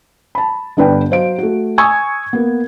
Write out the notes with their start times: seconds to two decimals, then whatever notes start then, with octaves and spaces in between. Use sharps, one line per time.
0.35 A5 B5
0.77 G1 D4 B4 G5
1.11 F#3 C5 F5 D7
1.38 A3 F#4
1.78 G#5 C#6 D#6 E6 G#6
2.33 A#3 B3